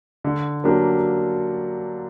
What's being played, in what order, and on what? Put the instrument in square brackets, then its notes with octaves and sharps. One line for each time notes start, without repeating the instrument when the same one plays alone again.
[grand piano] D3
F#3 A#3 D4 G4